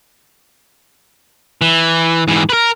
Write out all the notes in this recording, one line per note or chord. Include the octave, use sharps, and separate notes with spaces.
E3
G#2 E3
A#4 B4